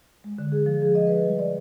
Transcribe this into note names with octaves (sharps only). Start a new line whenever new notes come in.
G#3
D3
G#4
F3
G#4
D#5
B4
G3
D5